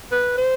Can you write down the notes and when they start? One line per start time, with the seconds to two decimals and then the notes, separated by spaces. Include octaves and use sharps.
0.12 B4
0.37 C5